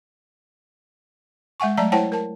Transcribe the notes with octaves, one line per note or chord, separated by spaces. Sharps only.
G#3 E5 F#5 G#5 C#6
F#3 A3 D5 E5 A5 A#5
E4 C5 C#5 F#5 G5 A5
A#4 A5